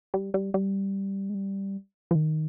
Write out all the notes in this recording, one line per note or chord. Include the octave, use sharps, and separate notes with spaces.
G3
G3
G3
G#3
G3
F3
D#3